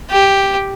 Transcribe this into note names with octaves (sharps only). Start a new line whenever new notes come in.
G4